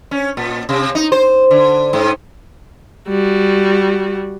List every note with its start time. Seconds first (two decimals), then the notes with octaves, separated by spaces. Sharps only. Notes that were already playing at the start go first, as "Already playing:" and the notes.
0.11 C#4
0.37 A#2
0.69 C3
0.95 D#4
1.12 C5
1.51 D3
1.93 G#2
3.09 G3 F#4